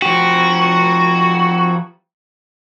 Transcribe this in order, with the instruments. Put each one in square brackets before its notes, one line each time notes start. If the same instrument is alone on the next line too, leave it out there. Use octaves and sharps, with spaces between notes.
[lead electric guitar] F3 G4 [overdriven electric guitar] F#4